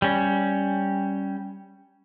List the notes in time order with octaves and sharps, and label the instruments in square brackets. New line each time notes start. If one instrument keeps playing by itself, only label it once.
[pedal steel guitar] G3 C#4